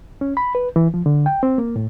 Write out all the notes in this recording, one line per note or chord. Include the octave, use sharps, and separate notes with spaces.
C#4
B5
B4
E3
F3
D3
G5
C4
A#3
A2